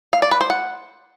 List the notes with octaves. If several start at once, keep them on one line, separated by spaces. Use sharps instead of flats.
F5
D5
B4
C5
F#5